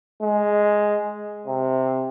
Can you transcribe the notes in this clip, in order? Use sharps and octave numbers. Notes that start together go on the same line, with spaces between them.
G#3
C3